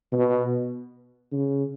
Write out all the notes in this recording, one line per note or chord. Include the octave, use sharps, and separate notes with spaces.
B2
C#3